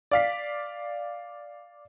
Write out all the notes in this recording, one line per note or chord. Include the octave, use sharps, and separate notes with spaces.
D5 F5 B6